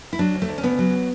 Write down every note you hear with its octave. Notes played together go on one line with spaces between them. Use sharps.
E4
F#3 D4
D2
A3
D2
C#4
C#3 B3
F#3